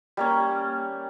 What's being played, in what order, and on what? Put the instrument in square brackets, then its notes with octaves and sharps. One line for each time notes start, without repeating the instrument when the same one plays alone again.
[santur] G3 A#3 C#4